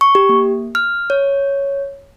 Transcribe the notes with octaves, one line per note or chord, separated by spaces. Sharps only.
C#6
G4
A#3
F6
C#5